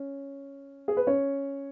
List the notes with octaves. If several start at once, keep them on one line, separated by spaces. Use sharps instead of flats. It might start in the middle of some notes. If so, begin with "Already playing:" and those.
Already playing: C#4
G#4
B4
C#4 C#5